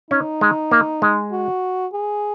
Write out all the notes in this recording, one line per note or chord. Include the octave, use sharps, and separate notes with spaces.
C#4 D#4
G#3
A#3
G#3
F#4
G#4